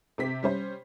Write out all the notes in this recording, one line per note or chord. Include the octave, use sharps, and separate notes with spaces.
C3 C4 B6
G3 C#4 C5